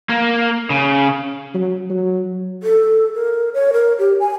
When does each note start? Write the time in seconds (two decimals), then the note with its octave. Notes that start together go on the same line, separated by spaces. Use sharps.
0.09 A#3
0.70 C#3
1.54 F#3
1.90 F#3
2.63 A4
3.14 A#4
3.54 C#5
3.73 A#4
3.99 G4
4.20 G#5